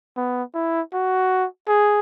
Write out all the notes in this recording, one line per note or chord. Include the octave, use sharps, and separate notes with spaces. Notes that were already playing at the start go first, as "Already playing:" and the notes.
B3
E4
F#4
G#4